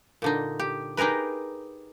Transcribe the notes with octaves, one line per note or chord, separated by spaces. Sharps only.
A#2 D3 D#4
G4
D#4 G4 G#4 A#4 B4